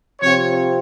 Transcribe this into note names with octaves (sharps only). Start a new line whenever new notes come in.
C3 F3 C4 F4 C#5